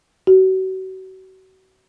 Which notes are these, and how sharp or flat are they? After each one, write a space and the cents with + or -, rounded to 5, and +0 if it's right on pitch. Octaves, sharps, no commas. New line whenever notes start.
F#4 +35